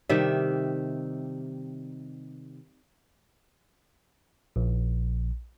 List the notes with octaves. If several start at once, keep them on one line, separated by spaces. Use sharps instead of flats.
C3 D#3 G3 E5
A#1